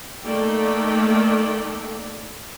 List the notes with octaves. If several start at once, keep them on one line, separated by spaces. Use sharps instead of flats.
A3 A#3 D#4 A4 D5 G5